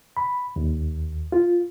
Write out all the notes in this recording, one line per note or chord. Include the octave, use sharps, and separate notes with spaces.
B5
D#2
F4